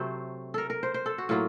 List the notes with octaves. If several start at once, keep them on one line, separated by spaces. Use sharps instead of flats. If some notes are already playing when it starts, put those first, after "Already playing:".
Already playing: C3 F#3 A3 C5
A4 A#4
A#4
C5
C5
A4
F#4
A2 F#3 A#3 F4